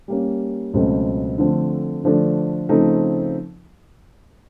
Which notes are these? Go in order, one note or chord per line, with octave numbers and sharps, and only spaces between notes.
G3 A#3 C#4
C#2 B2 F#3 A3 C4
D3 F3 A3 C4
D3 F3 A3 D4
C#3 F3 A3 C4 D#4